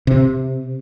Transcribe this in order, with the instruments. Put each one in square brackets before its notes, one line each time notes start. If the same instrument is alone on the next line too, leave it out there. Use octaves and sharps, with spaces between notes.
[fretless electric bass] C3